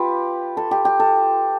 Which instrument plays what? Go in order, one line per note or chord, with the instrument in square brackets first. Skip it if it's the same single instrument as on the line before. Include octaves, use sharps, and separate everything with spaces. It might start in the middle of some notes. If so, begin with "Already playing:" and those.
Already playing: [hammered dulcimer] F4 G4 B4
A4
G4
G4
A4